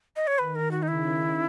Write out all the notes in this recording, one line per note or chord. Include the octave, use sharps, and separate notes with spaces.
D#5
C#5
D#3 B4
A#4
F#4
D#4
C#3 E4